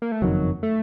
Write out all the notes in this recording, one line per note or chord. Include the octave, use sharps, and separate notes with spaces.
A#3
A3
F#1 F2 D#3 F#3
A3